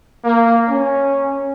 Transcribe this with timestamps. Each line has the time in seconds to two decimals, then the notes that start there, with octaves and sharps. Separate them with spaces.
0.24 A#3
0.68 C#4